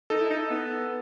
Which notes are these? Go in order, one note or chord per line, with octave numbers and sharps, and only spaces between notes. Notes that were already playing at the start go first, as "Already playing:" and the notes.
D#4 A4
E4
D#4
B3